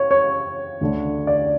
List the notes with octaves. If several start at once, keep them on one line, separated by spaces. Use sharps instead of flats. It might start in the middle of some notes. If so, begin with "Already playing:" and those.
Already playing: C#5
C#5
D2 D3
D5